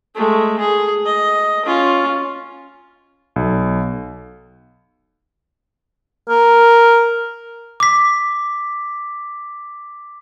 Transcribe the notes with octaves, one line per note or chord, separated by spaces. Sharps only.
G#3 A3
G#4
D#5
C#4 F4
B1
A#4
D6 B6